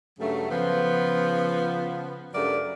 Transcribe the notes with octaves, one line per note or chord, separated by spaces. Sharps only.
G2 C#3 F#3 A3
C#3 F3 B3
G2 C#3 F#3 A3 A#4 D5